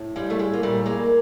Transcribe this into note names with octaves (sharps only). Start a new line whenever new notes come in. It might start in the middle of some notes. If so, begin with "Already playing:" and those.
Already playing: A2
G3 G#3
A3
G#3
A#3
A#2 G3 A3
G#3 A#3